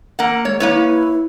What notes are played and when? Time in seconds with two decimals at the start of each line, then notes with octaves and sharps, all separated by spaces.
0.19 A#3 F#5
0.45 G#3 C#5
0.60 A#3 E4 B4 C#5
0.74 E4